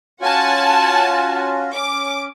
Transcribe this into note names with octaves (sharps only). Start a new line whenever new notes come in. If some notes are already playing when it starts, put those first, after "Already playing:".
C#4 F4 F#4 F#5 G#5 A5
C#4 D6